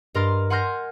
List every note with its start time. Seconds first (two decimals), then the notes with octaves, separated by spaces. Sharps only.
0.14 G2 A#4 D#5 C6 F6 A6
0.50 F#5 G#5 C6 F6 G6 A#6